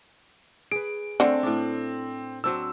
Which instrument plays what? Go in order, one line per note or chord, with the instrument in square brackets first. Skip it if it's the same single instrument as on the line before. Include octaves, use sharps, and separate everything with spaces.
[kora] G#4 B4 [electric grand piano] D7
[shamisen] D3 [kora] A3 C#4 F#5 [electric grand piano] C4
[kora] A2 D4
[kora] F#3 C4 D4 [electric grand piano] E6